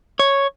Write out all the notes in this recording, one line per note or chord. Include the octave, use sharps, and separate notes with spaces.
C#5